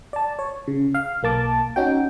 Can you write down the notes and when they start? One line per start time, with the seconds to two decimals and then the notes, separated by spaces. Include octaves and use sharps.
0.13 D5 A5
0.39 C#5
0.67 C#3
0.94 F5
1.23 B1 A#3 A5 D6
1.76 C#4 D#4 F#4 G5